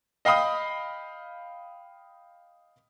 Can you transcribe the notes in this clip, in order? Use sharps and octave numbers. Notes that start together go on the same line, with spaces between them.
D#5 F5 G5 B5 D#6